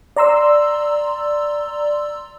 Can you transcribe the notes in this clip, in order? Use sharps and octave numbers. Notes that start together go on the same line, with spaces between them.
D5 A#5 C6 E6